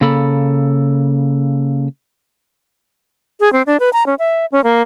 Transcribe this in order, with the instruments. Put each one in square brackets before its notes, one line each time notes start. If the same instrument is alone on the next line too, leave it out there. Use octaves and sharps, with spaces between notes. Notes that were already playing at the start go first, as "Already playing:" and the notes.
[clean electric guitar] C#3 A#3 A4 B5
[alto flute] G#4
C4
D4
B4
A#5
C#4
E5
C#4
A#3